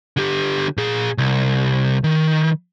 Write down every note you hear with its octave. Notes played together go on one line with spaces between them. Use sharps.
D3 G4
A#2 G#4
C2
D#3